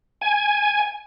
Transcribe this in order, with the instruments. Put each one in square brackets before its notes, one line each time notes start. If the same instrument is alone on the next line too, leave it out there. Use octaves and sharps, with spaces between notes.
[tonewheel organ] G#5